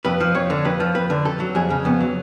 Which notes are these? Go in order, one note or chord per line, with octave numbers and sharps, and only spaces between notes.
F2 B4
F3
F2 C#5
D3
F2 B4
F3
F2 B4
D3
F2 A4
F#3
F2 G#4
C#3
F2 B3
F#3